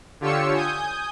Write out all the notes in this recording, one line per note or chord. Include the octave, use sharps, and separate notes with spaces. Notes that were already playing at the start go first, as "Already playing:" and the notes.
D3 F4 G4 C#5 E6 C#7
G#5 D#6 G6